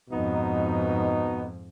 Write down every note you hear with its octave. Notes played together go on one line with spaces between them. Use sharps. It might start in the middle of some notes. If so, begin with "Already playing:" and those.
F2 G#2 B2 B3 D#4